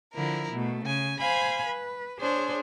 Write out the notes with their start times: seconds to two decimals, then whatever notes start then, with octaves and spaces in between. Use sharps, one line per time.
0.15 D3 F3 E4 A#4
0.53 B2 A3
0.85 C#3 G#5
1.21 C5 F5 G#5 B5
1.66 B4
2.20 D4 G#4 C5 C#5